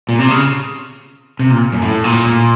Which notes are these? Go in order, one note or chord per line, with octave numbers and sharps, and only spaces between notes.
A#2
C3
C#3
C3
A#2
F#2
A2
A#2
A#2